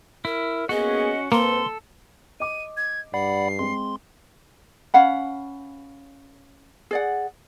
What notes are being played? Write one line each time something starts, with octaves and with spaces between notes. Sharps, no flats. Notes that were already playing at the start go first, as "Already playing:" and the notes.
E4 A#4
A#3 B3 C#4 F#4 G#4 D#5
G#2 A#3 C4 A4 B4 C6
D#5 D6 D#7
G#6
G2 D5 F#5 B5 C7
G#3 C4 C6
C#4 F5 F#5 B5
G#4 D5 F#5